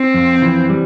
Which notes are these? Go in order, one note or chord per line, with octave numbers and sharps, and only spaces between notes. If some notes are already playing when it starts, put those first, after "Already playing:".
Already playing: C4
F2
E3
G3